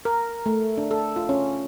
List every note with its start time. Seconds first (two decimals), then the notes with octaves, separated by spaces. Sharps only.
0.05 A#4
0.46 A3
0.78 D4
0.91 A4
1.16 F4
1.29 C#4